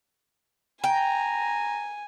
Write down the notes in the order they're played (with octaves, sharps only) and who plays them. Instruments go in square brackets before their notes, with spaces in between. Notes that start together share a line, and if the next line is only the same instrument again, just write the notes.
[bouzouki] G5 [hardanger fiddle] G#5 [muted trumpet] A#5